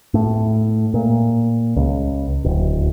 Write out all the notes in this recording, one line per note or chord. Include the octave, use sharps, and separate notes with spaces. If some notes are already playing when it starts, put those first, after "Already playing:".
A2
A#2
C#2
D1